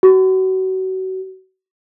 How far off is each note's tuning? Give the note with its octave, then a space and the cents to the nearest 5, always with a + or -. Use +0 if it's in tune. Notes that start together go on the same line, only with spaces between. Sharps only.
F#4 +30